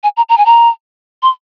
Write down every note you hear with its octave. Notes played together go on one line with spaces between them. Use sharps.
G#5
A#5
A#5
G#5
A#5
C6